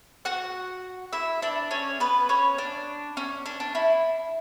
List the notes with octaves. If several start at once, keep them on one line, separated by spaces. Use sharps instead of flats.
F#4 F#5
E4 E5
D4 D5
C#4 C#5
B3 B4
C#4 C#5
D4
C#4
D4
D4
E4